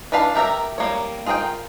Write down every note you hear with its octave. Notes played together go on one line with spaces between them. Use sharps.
E3 D4 B4 F5 A5
G4 A#4 E5 A#5
G3 A#3 C#5
F4 G#4 A#4 D5 G5